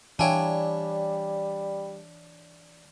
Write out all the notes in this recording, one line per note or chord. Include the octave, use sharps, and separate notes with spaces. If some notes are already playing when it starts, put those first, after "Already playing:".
E3 G3 D4 E4 C#5 F5 G5 G#5